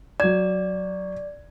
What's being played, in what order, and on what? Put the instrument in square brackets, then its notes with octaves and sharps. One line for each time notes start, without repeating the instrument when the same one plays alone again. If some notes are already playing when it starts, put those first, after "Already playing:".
[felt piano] F#3 G#6 [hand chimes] D5